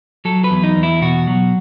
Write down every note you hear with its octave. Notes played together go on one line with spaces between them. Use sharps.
F#3 A4
B4
E2
D#4
E2
E4
B2 F#4
F#3